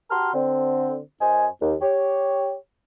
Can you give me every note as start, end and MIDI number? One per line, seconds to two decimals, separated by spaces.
0.11 0.33 66
0.11 0.33 67
0.11 0.33 81
0.11 0.33 82
0.11 0.33 84
0.11 0.33 89
0.34 0.98 50
0.34 0.98 60
1.21 1.48 42
1.21 1.48 72
1.21 1.48 75
1.21 1.48 80
1.62 1.74 39
1.82 2.54 67
1.82 2.54 73